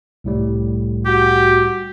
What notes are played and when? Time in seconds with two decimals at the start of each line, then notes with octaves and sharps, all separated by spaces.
0.24 C2 A2 G3
1.05 F#4 G4